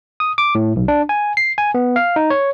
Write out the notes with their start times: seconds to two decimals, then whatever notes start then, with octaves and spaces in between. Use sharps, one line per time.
0.20 D#6
0.38 D6
0.55 A2
0.76 B1
0.88 D4
1.09 G#5
1.37 C7
1.58 G#5
1.74 B3
1.96 F5
2.16 D#4
2.30 C#5